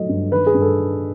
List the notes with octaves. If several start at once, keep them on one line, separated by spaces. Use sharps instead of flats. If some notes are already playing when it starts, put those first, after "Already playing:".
Already playing: F#3 A3 D#5
G2
D#3 B4
G#4
G2
A4